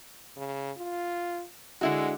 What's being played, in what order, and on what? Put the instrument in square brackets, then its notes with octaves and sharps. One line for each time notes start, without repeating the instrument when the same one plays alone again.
[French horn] C#3
F4
[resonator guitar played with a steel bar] D3 E4 F#4 [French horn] G#3